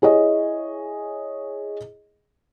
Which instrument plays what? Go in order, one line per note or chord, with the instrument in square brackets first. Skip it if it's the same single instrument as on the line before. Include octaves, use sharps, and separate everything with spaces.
[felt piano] E4 G#4 C#5 D#5